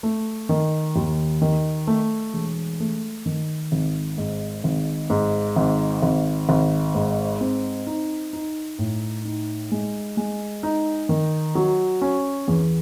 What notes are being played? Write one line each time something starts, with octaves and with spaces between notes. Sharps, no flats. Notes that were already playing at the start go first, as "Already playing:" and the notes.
A3
D#3
D#2
D#3
A3
E1
A3
D#3
G#1
G#2
G#1
G#2
G#1
G#1
G#1
G#2
C4
D#4
D#4
A2
D#4
G#3
G#3
D#4
D#3
F#3
C#4
E2